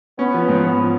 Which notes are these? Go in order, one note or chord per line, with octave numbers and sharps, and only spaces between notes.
B3 C#4
F3
G#2
F3